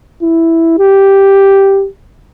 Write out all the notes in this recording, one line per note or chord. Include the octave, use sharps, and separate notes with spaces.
E4
G4